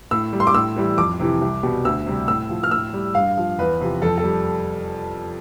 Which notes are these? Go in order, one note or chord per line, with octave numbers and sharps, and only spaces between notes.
A2 E6
G3
C6
D6
A2 E6
E3 G3
F2 D6
C3 E3
C2
B2 G3
D2 E6
C3 G3
A2 E6
F3
F6
A2 E6
G3
G2 F5
F3
E2 B4
C3 F3
F2 A4
A4
G3